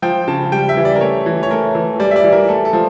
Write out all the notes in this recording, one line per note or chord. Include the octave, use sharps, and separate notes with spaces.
F3 G5
C#3 A5
G3 G5
E5
E3
D5
A#4
A3 C#5
E3
C#5
A3 A#4
E3
G3 D5
E5
D5
E3
A#4
A3 A4
A4
F3